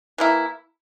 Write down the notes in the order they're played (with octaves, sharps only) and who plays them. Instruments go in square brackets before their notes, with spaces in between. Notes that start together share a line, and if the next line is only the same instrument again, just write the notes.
[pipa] E3 A#3 E4